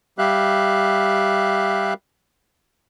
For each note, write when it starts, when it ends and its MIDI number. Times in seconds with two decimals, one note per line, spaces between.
0.18 1.93 55
0.18 1.93 67
0.18 1.93 76
0.18 1.93 77
0.18 1.93 90